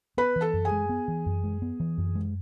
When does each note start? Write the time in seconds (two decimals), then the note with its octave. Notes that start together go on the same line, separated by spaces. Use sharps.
0.17 B3 B4 B5
0.36 E3
0.41 A4 A5
0.53 F#2
0.65 G#4 G#5
0.72 G#3
0.89 B3
1.08 E3
1.26 F#2
1.44 G#3
1.62 B3
1.80 E3
1.98 F#2
2.15 G#3